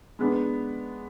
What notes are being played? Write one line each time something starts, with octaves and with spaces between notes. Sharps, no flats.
G#3 B3 D4